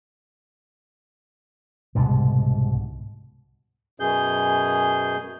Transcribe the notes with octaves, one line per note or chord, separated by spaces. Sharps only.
C2 G#2 B2 D3
F#2 B2 G#4 G6